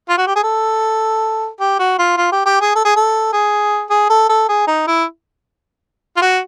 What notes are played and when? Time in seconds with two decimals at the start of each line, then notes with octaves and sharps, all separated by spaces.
0.09 F4
0.18 F#4
0.27 G4
0.36 G#4
0.44 A4
1.60 G4
1.79 F#4
1.99 F4
2.17 F4
2.32 G4
2.46 G4
2.61 G#4
2.75 A4
2.85 G#4
2.96 A4
3.33 G#4
3.90 G#4
4.10 A4
4.29 A4
4.48 G#4
4.67 D#4
4.87 E4
6.16 F4
6.22 F#4